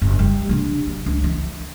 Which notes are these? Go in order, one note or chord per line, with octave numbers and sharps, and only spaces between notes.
F#1
G3
C3 D4
F#3
C#2
E3